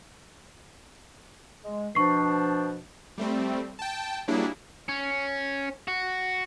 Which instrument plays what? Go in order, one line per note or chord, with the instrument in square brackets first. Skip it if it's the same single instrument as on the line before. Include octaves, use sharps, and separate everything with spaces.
[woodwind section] G#3
[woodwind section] B2 F3 D4 [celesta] C#6 C7
[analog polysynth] G3 A3 C4
G5 A5
F#3 G3 A#3 D4 E4 G#4
[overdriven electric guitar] C#4
F#4